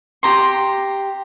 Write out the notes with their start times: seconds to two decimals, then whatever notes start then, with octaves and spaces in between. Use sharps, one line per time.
0.23 G4 A#5 C6